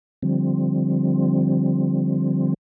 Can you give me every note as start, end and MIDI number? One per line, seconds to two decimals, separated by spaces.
0.23 2.54 50
0.23 2.54 53
0.23 2.54 55
0.23 2.54 60